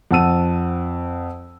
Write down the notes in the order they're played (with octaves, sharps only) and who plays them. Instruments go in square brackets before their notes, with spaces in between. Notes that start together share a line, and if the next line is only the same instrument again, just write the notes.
[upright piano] F2 F#5 A5 E6 D#7